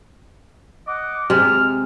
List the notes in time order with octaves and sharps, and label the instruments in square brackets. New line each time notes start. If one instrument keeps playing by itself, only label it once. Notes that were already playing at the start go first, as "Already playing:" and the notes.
[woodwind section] D#5 F#5 D6
[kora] C3 G#3 [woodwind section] F6